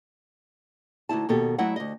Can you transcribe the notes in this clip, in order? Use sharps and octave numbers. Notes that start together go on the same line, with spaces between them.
D2 D#4 E4 A5
D#2 B2 G4 A4
F#3 A3 E4 D#5 F#5
D2 D#5